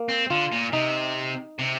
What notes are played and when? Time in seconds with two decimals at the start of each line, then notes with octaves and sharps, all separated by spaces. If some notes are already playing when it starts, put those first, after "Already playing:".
Already playing: A#3
0.09 C4
0.30 D3 F4
0.52 A#2
0.73 C3 D#4
1.59 C3